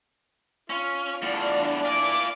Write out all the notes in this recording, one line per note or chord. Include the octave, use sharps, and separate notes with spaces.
C#4 F4
E2 A2 D4
E4 F4 D5 G#5 D6